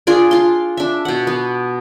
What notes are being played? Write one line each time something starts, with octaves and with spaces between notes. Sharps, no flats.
D4 F4 G#4 D5
F4 C6
D4 E5
B2 F#5
B3